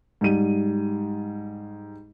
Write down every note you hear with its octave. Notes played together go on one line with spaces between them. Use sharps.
G#2 G3 D#7